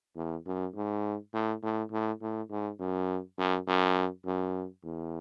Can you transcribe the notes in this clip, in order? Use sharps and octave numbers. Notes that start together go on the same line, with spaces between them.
E2
F#2
G#2
A2
A2
A2
A2
G#2
F#2
F#2
F#2
F#2
E2